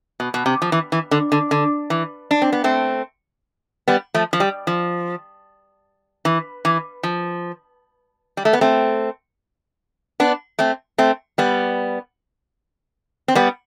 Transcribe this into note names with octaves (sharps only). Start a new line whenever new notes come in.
B2
B2
C3
F3
E3
E3
D3
D3
D3
E3
D4
C4
B3
A3 C4
G3 B3
F3 A3
F3
G3
F3
E3
E3
F3
G3
A3
B3
A3 C4
B3 D4
A3 C4
A3 C4
G3 B3
C4
G3 B3